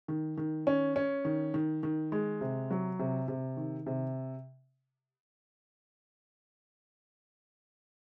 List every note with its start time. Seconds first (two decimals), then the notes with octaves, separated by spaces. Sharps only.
0.08 D#3
0.37 D#3
0.67 C#4
0.96 C#4
1.25 D#3
1.54 D#3
1.83 D#3
2.12 G#3
2.41 C3
2.71 F#3
2.99 C3
3.28 C3
3.57 D#3
3.86 C3